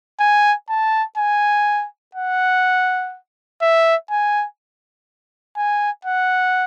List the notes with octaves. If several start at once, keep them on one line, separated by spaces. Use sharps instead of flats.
G#5
A5
G#5
F#5
E5
G#5
G#5
F#5